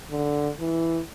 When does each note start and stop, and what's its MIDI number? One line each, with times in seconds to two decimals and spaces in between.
0.10 0.49 50
0.60 0.99 52